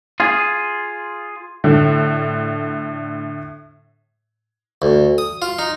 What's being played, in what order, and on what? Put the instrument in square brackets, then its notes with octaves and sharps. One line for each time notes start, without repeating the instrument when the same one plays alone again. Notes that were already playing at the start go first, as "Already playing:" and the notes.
[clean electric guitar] F4 G#4
[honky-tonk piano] A2 D3
[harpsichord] D2
D#6
F4
D#4